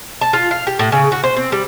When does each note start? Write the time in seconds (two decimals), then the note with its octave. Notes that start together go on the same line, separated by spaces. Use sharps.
0.21 A5
0.33 F4
0.51 F5
0.67 G4
0.79 A2
0.92 C#3
1.12 F#4
1.24 C5
1.37 C4
1.52 G3